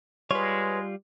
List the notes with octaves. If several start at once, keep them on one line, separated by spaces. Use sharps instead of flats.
G3 G#3 F4 B4 C#5